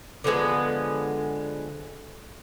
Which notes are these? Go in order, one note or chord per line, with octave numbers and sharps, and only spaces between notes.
D3 F3 G#3 B3